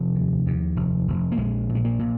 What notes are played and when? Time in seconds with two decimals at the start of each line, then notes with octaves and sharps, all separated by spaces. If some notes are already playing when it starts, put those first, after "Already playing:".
Already playing: F1 F3
0.15 D#2
0.46 D#2
0.76 F1
1.08 F1
1.32 A#3
1.37 A#1 G#3
1.69 A#2
1.75 G#3
1.85 A#3
1.99 A#2